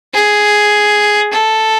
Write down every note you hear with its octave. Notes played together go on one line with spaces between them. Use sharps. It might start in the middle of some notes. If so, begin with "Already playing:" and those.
G#4
A4